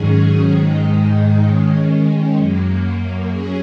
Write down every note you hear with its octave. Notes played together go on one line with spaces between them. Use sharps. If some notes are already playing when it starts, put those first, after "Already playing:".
Already playing: G#2 D#3 F#3 C#4 G#4
G#2 D#3 G#3 D#4
D#3 G#3 C#4
F#2 F#3 A#3
F#3 C#4 G#4